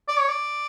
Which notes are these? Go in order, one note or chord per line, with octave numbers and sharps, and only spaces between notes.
D5
C#5
D5